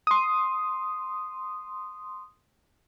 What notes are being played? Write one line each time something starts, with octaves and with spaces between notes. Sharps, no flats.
C6 D#6